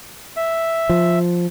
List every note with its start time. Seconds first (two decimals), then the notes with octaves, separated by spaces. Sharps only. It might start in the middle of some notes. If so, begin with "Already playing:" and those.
0.37 E5
0.90 F3